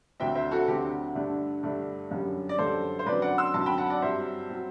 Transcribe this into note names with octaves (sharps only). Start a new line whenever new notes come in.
D2 D3 F#3 C4 E5 G5
C5 E5
F#4 A4
D2 D3 F#3 C4 G4
G2 D3 A3 D4
G2 D3 A3 D4
F#2 D3 G3
D5
F#2 D3 G3 A4 C5
C5
F#2 D3 F#3 C4 B4 D5
D5 F#5
C6 E6
F#2 D3 F#3 C4 A5 C6
G5 B5
F#5 A5
D5 F#5
G2 F#3 C4 C5 E5
F#3 C4